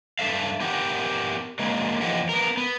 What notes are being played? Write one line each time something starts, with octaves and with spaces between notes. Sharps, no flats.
G2 G#3 A4 E5 F5
B3 G4 A#4 F#5
D3 F#3 G#3 A#3
E2 A2 F3 G4 D#5 F#5
B3 A#4
B3